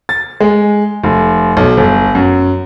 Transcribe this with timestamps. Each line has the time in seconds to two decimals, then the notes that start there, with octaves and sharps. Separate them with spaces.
0.09 A6
0.41 G#3
1.04 F1
1.57 B1
1.77 G1
2.15 F#2